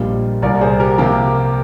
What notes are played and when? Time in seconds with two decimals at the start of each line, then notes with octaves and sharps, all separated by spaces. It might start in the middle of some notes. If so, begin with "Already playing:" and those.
Already playing: A#1 A#2 G3 A#3 D#5
0.42 C2 A#2 G3 A#4 D5
0.61 G#4 C5
0.80 G4 A#4
0.98 C3 F3 A#3 G4 A#4